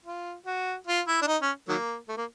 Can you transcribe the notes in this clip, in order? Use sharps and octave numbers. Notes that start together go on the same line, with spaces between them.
F4
F#4
F4
E4
D4
D#4
C#4
D#3 F#3 A#3
A3
A#3